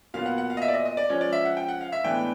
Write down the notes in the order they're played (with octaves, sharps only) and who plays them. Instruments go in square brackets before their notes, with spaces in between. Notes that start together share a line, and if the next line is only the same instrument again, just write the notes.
[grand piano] A#2 F#3 B3 F5
F#5
F#5
F5
D#5
E5
D5
D#5
D#5
D5
F3 G#3 C#4 C#5
D5
E5
F#5
G5
F#5
F5
E5
A2 E3 G#3 B3 D4 G5